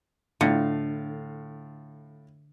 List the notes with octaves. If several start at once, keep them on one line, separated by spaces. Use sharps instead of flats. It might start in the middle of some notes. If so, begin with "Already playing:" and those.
A2 D3 F4 F5